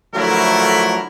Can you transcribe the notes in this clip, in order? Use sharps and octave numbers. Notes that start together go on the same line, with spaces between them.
D3 F3 F#3 A3 E4 A#4